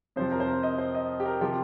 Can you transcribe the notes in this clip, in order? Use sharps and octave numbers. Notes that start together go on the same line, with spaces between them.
F2 C3 F3 C5
A#4
C5
A#4
D#5
C5
D#5
G4
A#4
C3 F3 G4